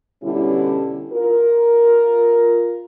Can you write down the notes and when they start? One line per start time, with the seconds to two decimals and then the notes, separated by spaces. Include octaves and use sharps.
0.23 B2 D3 G3 C#4 E4
1.13 F4 A#4